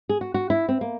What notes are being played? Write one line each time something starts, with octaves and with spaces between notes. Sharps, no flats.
G#4
F#4
F#4
E4
C4
A#3